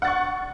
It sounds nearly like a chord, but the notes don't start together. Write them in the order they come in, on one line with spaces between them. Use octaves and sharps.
F#5 A6 C#6